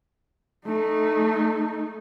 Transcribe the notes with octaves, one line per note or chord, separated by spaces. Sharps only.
A3 D#4